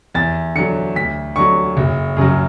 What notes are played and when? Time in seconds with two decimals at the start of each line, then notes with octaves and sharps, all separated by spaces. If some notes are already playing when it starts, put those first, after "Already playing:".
0.14 E2 A6
0.55 D3 F#3 C#7
0.95 D2 B6
1.36 D3 F#3 C#6
1.77 F#1
2.17 F#2 C#3 F#3